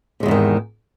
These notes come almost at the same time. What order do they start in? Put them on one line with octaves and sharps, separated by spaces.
C3 G#3 E2 G#2 D#3